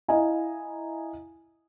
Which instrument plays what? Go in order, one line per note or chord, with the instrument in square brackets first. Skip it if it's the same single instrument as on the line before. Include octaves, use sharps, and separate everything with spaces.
[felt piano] E4 D#5 F5 G#5 A#5